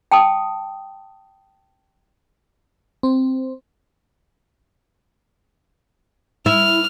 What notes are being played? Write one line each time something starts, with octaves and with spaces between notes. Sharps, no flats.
G5 A5 D#6
C4
E4 F6